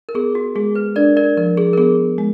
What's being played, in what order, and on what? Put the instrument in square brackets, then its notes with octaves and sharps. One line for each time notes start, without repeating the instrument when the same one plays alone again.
[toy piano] A#4
[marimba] B3 [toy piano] G#4
[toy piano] F#4
[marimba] G#3 [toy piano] G#4
[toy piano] B4
[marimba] D4 [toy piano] A#4 D5
[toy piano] A#4 D5
[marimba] F3 [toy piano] A#4
[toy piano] G#4
A#4
[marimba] B3 [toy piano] G#4
[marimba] G#3